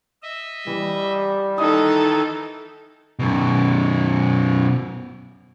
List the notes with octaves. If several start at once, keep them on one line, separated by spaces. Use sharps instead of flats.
D#5 E5
E3 G3
D#3 E3 D#4 A4 D#5 A5 D#6
F#2 B2